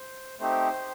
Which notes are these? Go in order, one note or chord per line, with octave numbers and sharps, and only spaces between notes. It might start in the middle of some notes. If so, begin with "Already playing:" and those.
Already playing: C5
A3 C4 D#4 G4 C5